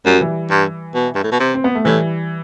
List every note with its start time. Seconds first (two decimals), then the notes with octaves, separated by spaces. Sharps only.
0.05 F#2 G3
0.13 F#3
0.20 E3 G3
0.50 G2
0.95 B2
1.15 G2
1.24 A2
1.31 B2
1.40 C3
1.54 C4
1.64 B3
1.75 A3
1.84 A2 E3 G3